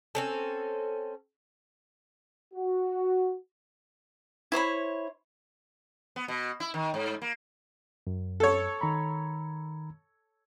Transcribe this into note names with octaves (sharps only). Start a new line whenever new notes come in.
C4 C#4 A4
F#4
E4 C5 C#5 B5
B3
B2
E4
D#3
G#2
A#3
F#2
A4 C#5
D#3 A#5 B5